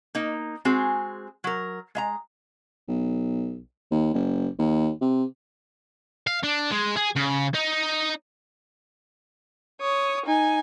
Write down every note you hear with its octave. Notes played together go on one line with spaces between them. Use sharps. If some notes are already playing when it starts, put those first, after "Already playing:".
A#3 D#4
G#3 C4 F#4 G#4
F#3 A#4
G#3 E5 A#5
B1
D#2
F#1
D#2
C3
F5
D4
G#3
G#4
C#3
D#4
C#5 D#6
D#4 G#5